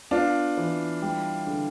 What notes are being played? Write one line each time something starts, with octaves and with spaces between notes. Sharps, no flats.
B3 D4 F4
E3
G3
D3